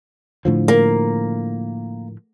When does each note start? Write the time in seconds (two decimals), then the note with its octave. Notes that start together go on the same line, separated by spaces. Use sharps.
0.45 A2 D3 F3
0.68 A#3